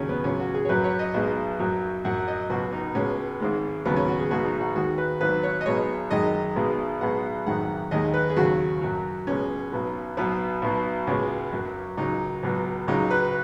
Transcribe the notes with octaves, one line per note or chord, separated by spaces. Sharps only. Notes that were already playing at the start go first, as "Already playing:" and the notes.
Already playing: D#2 C#3 F#3 C#4 G#4
B3
C#2 C#3 F#3 C#4
F#4
G#4
C#5
F#2 F#3 B4
C#5
D#5
B1 B2 G#3
F#2 F#3
F#2 F#3 F#5
D#5
C#2 B2 F#3 F#4
D#4
C#2 B2 G#3 C#4
G#1 G#2 G#3
D#2 C#3 F#3 B3
C#4
F#4
G#4
B1 B2 G#3 F#4
D#4
F#4
D#2 D#3 G#3 F#4
B4
G#1 G#2 F#3 B4
C#5
D#5
B1 B2 G#3 C#5
F#2 D#3 G#3 D#5
B1 B2 G#3
B1 B2 G#3 F#5
G#1 F#2 D#3 G#3 F#5
D#2 D#3 G#3 D#5
B4
G#4
D#2 C#3 F#3 F#4
F#2 F#3
C#2 B2 G#3 C#4
B1 B2 F#3
B1 B2 F#3 B3
B1 B2 F#3
C#2 B2 G#3 C#4
F#2 F#3
C#2 C#3 F#3 D#4
C#2 B2 F#3
C#2 C#3 F#3 D#4
B4